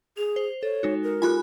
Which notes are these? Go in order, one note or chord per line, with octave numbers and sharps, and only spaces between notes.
G#4 F7
C5
A4 C#5
G#3 D#4 F#4
A#4
F4 G4 A4 G#5 B5 F#6